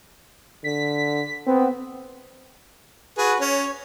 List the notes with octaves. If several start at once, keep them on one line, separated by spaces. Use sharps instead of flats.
D3 B6
B3 C4
F#4 G#4 B4
C#4 C#5